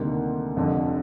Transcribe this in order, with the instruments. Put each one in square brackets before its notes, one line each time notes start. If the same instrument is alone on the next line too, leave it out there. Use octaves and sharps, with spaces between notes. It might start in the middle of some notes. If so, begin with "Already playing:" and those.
Already playing: [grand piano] D2 C3 D#3 G3 A#3
F1 F2 D3